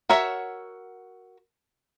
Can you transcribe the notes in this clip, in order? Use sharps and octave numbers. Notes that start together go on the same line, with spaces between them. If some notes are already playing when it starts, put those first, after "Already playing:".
F#4 A#4 C#5 E5